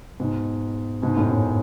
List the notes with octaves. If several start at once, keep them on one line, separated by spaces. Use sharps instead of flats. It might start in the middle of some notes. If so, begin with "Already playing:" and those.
G#2 B2
G#2 B2
F#2 A2
F#2